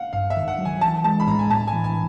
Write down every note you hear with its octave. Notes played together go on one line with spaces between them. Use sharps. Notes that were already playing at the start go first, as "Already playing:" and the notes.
Already playing: F5 F#5
G2 F5
E5
D#3
F#5
F#3
G#5
E3 A5
G#3 A5
B5
A2 A#5
G#5
A2 A5
G#5
E3
G#5